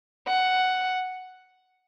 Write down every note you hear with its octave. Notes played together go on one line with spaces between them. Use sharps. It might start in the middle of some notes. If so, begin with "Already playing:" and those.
F#5